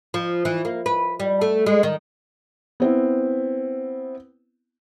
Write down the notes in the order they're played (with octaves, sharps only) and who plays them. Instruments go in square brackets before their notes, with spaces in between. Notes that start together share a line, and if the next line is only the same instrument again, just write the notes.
[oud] F3
E3
A#3
B4
G3
A3
G#3
D#3
[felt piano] B3 C4 E4